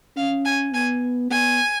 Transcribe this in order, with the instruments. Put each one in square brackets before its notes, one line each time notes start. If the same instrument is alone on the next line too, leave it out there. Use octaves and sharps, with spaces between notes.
[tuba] C#4 [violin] F5
[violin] G#5
[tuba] B3 [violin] G#5
[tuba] B3 [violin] G#5